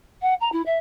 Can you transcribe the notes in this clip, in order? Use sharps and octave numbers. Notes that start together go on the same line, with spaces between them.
F#5
A#5
E4
E5